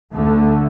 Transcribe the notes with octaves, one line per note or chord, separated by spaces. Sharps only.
D2 D3 A3